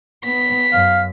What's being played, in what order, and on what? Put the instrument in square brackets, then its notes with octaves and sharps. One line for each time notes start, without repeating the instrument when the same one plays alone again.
[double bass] B3 [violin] B6
[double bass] F#2 [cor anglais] F5